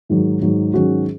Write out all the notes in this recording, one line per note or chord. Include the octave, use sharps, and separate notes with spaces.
G#2 D#3 F#3
G#2 D#3 F#3
G#2 D#3 F#3 C#4 F#4